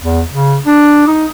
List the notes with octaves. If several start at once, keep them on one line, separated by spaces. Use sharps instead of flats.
E2
C#3
D4
D#4